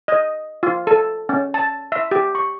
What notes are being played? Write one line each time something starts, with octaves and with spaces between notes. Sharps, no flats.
D#5
F4
A4
C#4
A5
E5
G4
C#6